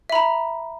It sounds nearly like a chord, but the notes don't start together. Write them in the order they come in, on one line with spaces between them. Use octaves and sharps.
E5 B5 A#5